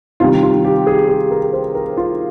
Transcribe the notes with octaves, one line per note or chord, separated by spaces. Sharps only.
C3 D#3 G3 F4
F4
G4
G#4
G#4
A#4
C5
A#4
F4